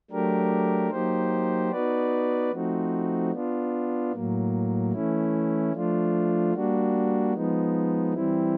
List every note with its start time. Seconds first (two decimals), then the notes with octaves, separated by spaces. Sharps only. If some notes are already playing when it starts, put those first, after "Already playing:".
0.10 F#3 A3 D4 G4 A#4
0.91 F#3 A#3 D#4 G4 C5
1.71 B3 D#4 F#4 B4 D5
2.52 F3 A3 C4 D#4 F#4
3.32 B3 D4 F4
4.12 A2 F#3 A#3
4.92 E3 A3 C#4 E4
5.73 F3 A3 D4 F4
6.54 G3 A#3 D4 F#4
7.34 F3 G#3 B3 D#4
8.14 E3 G3 C4 E4